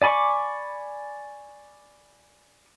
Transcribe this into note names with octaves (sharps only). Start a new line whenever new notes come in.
D5 G#5 B5 C#6 D6